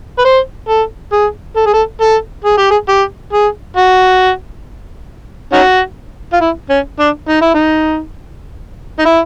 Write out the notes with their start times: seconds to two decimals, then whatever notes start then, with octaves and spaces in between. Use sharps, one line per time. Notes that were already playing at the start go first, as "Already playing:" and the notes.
0.18 B4
0.25 C5
0.68 A4
1.13 G#4
1.56 A4
1.66 G#4
1.74 A4
2.01 A4
2.45 G#4
2.58 G4
2.71 G#4
2.89 G4
3.33 G#4
3.77 F#4
5.53 C#4 D#4 F#4
6.33 F4
6.41 E4
6.70 C#4
6.99 D4
7.28 D#4
7.42 E4
7.54 D#4
8.99 D#4
9.05 E4